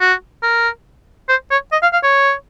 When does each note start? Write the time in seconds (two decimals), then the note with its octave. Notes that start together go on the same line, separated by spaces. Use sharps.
0.01 F#4
0.43 A#4
1.29 C5
1.51 C#5
1.72 D#5
1.83 F5
1.93 F5
2.03 C#5